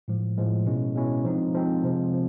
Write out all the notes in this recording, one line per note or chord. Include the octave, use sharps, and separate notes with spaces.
A2 F3 G#3
A2 F3 G#3
B2 G#3 C#4 E4
B2 G#3 C#4 E4
F3 G#3 C4 D#4
F3 G#3 C4 D#4
C3 F3 G#3 C4
C3 F3